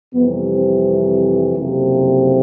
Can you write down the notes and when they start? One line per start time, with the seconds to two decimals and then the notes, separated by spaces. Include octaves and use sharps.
0.13 F2 C3 E3 G3 B3
0.49 C4
1.56 F#1 F2 C3